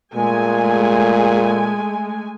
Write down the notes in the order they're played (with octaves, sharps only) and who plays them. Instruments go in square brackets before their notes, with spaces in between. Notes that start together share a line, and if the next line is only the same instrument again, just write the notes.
[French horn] A#2 [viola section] G#3 A3 G#5